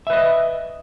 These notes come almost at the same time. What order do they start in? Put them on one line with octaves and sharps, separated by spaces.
E5 B4 D#5